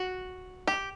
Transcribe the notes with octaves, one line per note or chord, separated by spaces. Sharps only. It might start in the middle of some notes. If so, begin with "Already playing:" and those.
Already playing: F#4
G4